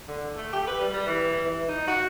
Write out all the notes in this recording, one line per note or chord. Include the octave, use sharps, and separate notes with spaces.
D3
A3
G4
B4
G3
G3
E3
E3
D#4
F#4